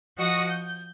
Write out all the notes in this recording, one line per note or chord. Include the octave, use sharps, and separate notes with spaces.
F3 F#4 D#5 F#5 D#6 A#6
G6